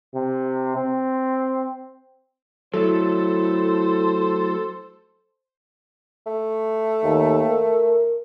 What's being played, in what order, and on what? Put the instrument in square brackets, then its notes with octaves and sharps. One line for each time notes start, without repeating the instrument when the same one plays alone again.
[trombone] C3
C4
[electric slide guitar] F#3 A3 [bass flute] E4 [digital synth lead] A4 [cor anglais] C5
[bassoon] A3
[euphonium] D#2
A#4